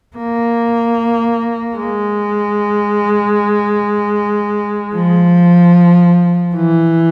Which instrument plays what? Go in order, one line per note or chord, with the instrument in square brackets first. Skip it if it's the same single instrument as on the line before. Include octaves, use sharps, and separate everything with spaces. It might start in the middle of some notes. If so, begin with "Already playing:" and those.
[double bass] A#3
G#3
F3
E3